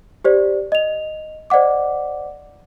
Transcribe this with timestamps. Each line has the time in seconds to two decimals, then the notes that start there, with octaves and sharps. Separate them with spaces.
0.24 G4 C5 D5
0.72 D#5 F7
1.50 C5 D5 D#5 F#5 D6